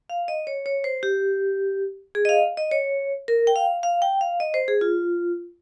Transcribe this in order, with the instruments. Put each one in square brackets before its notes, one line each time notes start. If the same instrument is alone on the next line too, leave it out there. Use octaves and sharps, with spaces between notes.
[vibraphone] F5
D#5
C#5
C#5
C5
G4
G#4
D#5
F5
D#5
C#5
A#4
G5
F5
F5
G5
F5
D#5
C5
G#4
F4